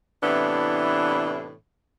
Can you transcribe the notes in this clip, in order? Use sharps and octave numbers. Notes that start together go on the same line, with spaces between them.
A2 C3 E3 B3 D4